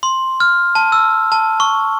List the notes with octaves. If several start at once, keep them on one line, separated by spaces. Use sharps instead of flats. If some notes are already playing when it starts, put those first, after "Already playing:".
C6
F6
A5
E6
A5
C#6